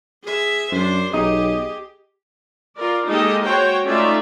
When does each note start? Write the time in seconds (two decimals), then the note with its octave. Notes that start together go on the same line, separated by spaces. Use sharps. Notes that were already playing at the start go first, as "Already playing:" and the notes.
0.23 G#4 E5
0.72 F#2 D4 C5
1.14 B1 G4 G#4 D#5
2.76 F4 A#4 D5
3.07 G#3 A#3 D#4 G4 A4 D#5
3.45 F#4 C5 C#5 G5
3.86 A3 C#4 D#4 F4 D5 E5